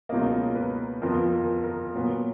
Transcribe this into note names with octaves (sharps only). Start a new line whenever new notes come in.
C#2 B2 F#3 A#3 D#5
B4
F2 F3 B3 A#4
A#4
A#4
A#2 F#3 B3